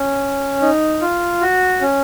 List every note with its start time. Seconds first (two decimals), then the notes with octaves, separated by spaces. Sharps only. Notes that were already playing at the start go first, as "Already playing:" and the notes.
Already playing: C#4
0.61 D#4
1.01 F4
1.41 F#4
1.81 C#4